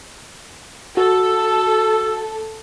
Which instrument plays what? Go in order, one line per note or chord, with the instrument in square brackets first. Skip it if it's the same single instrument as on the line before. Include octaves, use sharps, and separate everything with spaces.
[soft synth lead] F#4 [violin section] A4 [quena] E6